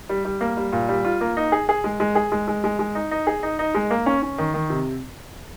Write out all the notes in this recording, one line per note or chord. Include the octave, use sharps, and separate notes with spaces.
G3
G3
A#3
G3
A#2
G3
F4
A#3
D#4
G#4
G#4
G#3
G#3
G#4
G#3
G#3
G#3
G#3
D#4
D#4
G#4
D#4
D#4
G#3
A#3
C#4
C#4
D#3
D#3
C3